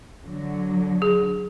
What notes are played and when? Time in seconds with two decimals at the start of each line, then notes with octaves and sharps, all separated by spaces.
0.25 D3 F#3
1.02 G#4